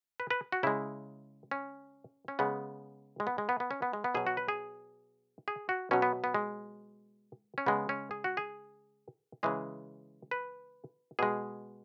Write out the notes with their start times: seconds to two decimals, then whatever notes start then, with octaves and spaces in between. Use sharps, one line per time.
0.20 B4
0.31 B4
0.52 F#4
0.63 C#3 G#3 E4
1.51 C#4
2.28 C#4
2.39 C#3 G#3 B3
3.20 G#3
3.27 B3
3.38 G#3
3.49 B3
3.60 B3
3.71 C#4
3.82 B3
3.93 G#3
4.04 B3
4.15 B2 F#3 G#4
4.27 F#4
4.37 B4
4.48 G#4
5.48 G#4
5.69 F#4
5.91 B2 F#3 C#4
6.02 B3
6.24 B3
6.34 G#3
7.58 C#4
7.66 C#3 G#3 B3
7.89 C#4
8.11 G#4
8.24 F#4
8.37 G#4
9.43 C#3 E3 G#3 G#4
10.31 B4
11.19 B2 G#3 G#4